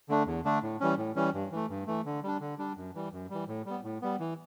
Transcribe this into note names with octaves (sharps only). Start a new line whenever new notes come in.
D3 A3 D4
E2
D3 A3 D4
A2
E3 G3 C#4
A2
E3 G3 C#4
G2
E3 A3
G2
E3 A3
D3
G3 D4
D3
G3 D4
F#2
E3 G3
F#2
E3 G3
A2
G3 B3
A2
G3 B3
E3